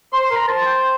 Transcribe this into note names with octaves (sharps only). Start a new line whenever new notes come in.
C5 C6
C6
A#4
A#5
C5 A5
G5